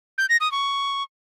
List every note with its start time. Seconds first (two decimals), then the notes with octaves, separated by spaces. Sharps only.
0.18 G6
0.29 A#6
0.41 D#6
0.52 C#6